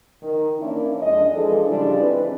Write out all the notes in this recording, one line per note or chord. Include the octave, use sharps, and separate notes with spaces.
D#3
E3 A#3 C#4 D4 E4
F2 G#3 D4 D#5
E3 F3 G#3 D4 G#4 A4
C#3 F3 G3 G#3 D4 E4
E3 G#3 C4 G#4 B4